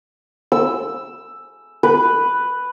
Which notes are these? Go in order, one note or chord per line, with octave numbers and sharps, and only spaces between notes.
E6
B4